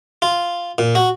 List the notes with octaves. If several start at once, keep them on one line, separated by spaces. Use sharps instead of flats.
F4
A#2
F#4